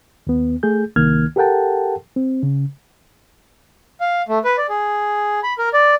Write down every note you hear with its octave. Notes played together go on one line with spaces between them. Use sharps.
D#2 B3
A3 G#4 G6
C2 D#3 A#3 F6 G#6
G4 A4 A#4 F#5 G5 A5
C4
C#3
F5
A3
B4
D5
G#4
B5
A#4
D5